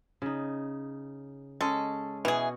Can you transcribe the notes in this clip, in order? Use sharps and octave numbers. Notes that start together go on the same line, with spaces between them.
C#3 D#4
G#3 C#4 A4
B2 E3 F#4 G#4